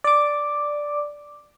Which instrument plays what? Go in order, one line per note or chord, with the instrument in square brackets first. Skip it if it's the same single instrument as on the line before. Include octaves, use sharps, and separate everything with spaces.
[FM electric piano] D5 D6